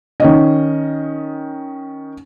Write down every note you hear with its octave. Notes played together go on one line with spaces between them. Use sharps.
D#3 C#4 D#5